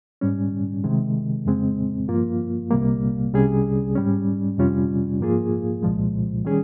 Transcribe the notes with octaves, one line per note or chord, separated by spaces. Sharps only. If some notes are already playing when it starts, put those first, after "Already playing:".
G#2 G3 C#4
C3 D#3 G#3
F2 C#3 G#3 C4
G2 F3 A#3 F4
C2 C3 G3 A#3
C2 C3 G3 C#4 G#4
G#2 G3 C#4
F2 C3 G3 C#4 F4
G#2 F3 A#3 F4 G#4
C2 A#2 F3 G#3
D#3 G3 C#4 G#4